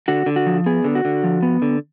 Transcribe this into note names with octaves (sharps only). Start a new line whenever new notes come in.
D3 F#4
D3
F#4
F3
B3 G#4
D3
F#4
D3
F3
B3
D3